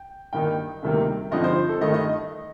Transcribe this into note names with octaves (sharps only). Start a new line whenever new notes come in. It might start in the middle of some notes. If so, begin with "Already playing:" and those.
Already playing: G5
G2 D#3 A#3 D#4 G5
D2 C3 D#3 G3 A#3
G2 D3 F3 C4 D#4 D#5
C5
A4
G2 D#3 A3 D#5
D#5